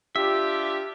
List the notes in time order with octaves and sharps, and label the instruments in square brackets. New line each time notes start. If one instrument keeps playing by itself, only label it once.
[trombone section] D4 F4 G4 [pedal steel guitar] E5